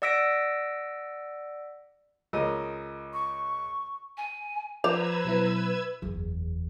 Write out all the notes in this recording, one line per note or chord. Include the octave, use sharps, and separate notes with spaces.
D5 F#5 E6 A#6 B6 D7
C#2 A#4 D#5
C#6
G#5
F3 B4 C5 D5 A#5 E6 G#6
B2 F#3 E4
F#1 E2